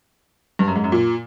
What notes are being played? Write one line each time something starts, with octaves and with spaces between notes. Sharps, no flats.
G2
F#2
G#2
F#2
A#2